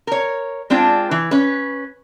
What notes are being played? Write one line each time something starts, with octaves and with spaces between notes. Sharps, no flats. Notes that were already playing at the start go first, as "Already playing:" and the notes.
A#4 C#5
G#3 C4 D4 F4
E3
C#4 B4